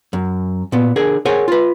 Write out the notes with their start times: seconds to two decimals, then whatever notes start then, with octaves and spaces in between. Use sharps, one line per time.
0.13 F#2
0.72 A#2 B3
0.96 D3 G#4 A#4 G#5
1.25 G#4 A#4 C5 C#5 F#5 G#5
1.48 F4 B4